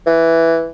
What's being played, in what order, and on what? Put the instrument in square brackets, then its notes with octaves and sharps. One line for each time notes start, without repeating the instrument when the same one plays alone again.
[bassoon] E3